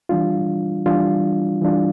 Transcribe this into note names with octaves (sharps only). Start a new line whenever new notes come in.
E3 G3 D4 F4
E3 G3 D4 F4
E3 G3 D4 F4